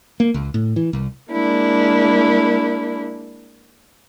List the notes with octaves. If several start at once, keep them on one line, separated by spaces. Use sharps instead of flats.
A#3
C#2
A2
E3
C2
G#3 A#3 D4 E4